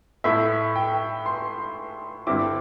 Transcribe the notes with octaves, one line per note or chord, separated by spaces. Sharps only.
A2 A3 E4 E5
G5
C6
G2 D3 C4 E4 D6